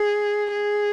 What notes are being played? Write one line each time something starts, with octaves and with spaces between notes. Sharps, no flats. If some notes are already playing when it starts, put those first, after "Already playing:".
Already playing: G#4
G#4